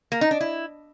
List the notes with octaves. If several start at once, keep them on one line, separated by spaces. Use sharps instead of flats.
A#3
D#4
D4
E4